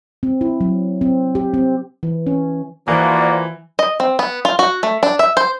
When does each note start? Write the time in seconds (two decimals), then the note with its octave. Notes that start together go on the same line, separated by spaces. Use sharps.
0.23 C4
0.41 E4
0.61 F#3
1.01 C4
1.35 G4
1.54 C4
2.03 E3
2.27 C#4
2.88 E3 F3 A#3 F#4 D5
3.79 D#5
4.00 C4
4.19 B3
4.45 F4
4.59 F#4
4.83 A3
5.03 D4
5.19 E5
5.37 C5